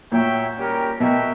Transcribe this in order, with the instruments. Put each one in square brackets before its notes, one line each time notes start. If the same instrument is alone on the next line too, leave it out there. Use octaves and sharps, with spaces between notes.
[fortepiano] A#2 [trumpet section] F#4 C#5 E5 G5
[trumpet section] G3 C#4 G4 A#4
[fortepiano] B2 [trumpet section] F#4 A#4 E5 G5